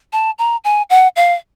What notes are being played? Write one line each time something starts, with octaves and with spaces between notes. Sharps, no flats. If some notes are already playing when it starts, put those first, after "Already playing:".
A5
A#5
G#5
F#5
F5